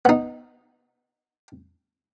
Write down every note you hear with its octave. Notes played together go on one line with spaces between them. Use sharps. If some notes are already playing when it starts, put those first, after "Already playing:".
B3 D#4